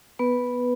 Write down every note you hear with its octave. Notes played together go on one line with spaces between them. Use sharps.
B3 B4